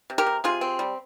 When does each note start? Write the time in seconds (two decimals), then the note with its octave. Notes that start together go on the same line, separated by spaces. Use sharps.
0.10 C3
0.18 G4 A#4
0.26 C3
0.44 C3 F4 G#4
0.61 C4
0.79 G3